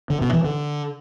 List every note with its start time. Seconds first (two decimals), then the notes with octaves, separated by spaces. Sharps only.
0.10 D3
0.22 B2
0.33 E3
0.44 D3